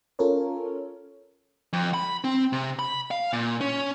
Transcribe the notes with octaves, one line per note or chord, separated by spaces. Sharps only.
C#4 F4 A4 A#4 C#5
F2
B5
C4
C3
B5
F5
A#2
C#4